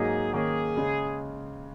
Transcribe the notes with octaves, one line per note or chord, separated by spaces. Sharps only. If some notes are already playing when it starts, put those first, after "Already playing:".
Already playing: G#2 F#3 A#3 D#4 G#4
D#3 A#3 C#4 G#4
C#3 G#3